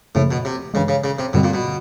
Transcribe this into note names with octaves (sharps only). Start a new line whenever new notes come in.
F#2 A2 C#3 F3 A#3
B2
C3
G2 C#3 E3 G#3
C#3
C#3
C3
G2 B2 D3 G3 C4
A#2
B2